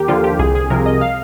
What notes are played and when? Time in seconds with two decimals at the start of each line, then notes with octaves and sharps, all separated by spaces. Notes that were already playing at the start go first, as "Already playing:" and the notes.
Already playing: D#2 G4 A#4
0.08 D3 F3 F4
0.24 G4
0.39 C2 G#4
0.55 G#4
0.70 C3 F3 A#4
0.86 D#5
1.01 F5